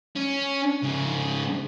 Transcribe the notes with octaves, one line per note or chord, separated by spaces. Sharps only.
C#4
G#2 C#3